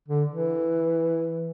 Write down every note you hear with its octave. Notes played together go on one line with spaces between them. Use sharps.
D3
E3